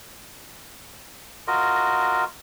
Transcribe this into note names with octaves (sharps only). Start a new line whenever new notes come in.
F4 F#4 A#4 D#5